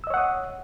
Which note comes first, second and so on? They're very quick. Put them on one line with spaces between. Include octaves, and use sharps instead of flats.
E6 D#5 C#5 F#5 D#6